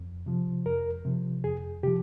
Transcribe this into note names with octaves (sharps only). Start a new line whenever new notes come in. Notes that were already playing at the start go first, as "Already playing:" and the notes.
Already playing: F2
C3 F3
F2 A#4
C3 F3
F2 G#4
C3 F3 G4